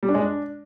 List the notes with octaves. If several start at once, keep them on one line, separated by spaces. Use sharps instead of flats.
G3
D4
G#3
D4